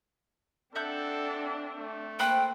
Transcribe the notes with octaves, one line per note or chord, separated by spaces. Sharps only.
C4 D4 A4 E5 F#5 G6
A3
A#3 C5 G5 B5 F#6